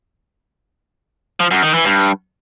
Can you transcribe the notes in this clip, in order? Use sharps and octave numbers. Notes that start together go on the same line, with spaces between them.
F3
F#2
D#3
E3
G2